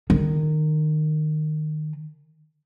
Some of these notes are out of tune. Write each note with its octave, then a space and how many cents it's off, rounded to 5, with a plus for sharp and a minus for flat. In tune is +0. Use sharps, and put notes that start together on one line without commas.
D#3 -20